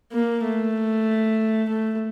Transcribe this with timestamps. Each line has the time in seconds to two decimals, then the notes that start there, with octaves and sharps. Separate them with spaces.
0.12 A#3
0.44 A3
1.69 A3